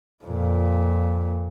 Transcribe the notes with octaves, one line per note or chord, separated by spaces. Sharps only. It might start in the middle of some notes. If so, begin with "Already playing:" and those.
F2 A#2